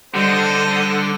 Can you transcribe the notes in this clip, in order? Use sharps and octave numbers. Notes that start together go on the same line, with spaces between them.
D3 G3 A4 C5 D#5